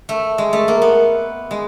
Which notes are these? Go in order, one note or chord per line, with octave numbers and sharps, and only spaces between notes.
A3
G#3
A3
A#3
B3
G#3